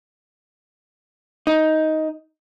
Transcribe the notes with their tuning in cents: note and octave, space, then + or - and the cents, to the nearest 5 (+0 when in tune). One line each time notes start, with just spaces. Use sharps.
D#4 +10